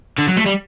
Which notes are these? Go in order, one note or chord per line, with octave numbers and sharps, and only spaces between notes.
D3
F#3
A3
G3